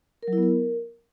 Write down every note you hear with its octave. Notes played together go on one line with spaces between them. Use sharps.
A#4
F#3
E4
B3
A#4